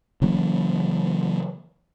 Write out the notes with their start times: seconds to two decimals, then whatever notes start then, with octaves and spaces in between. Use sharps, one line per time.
0.22 C#3 E3 F#3 A#3